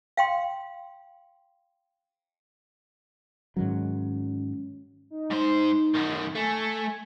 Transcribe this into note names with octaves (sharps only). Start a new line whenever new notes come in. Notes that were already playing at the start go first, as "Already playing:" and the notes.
F5 G5 C6
G#2 D#3 F#3 C#4
D#4
G#2 C5
F#2 D#3
A3 G#5